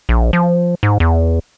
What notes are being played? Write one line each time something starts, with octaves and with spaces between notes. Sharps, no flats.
A#1
F3
G#2
E2